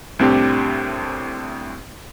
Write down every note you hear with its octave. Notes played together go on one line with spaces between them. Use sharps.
C2 A2 C4 D4 G4